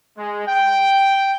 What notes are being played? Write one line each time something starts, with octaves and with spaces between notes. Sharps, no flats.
G#3
G5